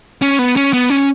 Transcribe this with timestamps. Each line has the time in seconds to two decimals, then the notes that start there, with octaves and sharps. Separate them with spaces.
0.22 C#4
0.39 B3
0.56 C#4
0.73 B3
0.90 C#4